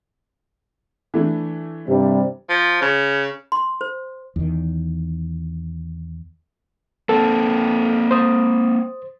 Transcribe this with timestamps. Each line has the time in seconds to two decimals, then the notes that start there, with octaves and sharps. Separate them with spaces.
1.14 E3 A3 D4
1.88 G2 C3 G3
2.50 F3
2.82 C#3
3.52 C6
3.81 C5
4.36 E2 D#3
7.09 A#3 C4 A4
8.11 C5 D#6